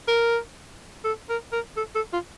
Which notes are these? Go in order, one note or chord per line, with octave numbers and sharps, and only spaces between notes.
A#4
A4
A#4
A#4
A4
A4
F4